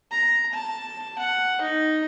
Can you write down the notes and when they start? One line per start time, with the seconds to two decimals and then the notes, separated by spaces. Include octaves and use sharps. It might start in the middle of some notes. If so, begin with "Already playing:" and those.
0.11 A#5
0.54 A5
1.19 F#5
1.61 D#4